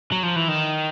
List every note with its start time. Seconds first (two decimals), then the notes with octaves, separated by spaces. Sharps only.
0.12 F#3
0.23 F3
0.36 E3
0.48 D#3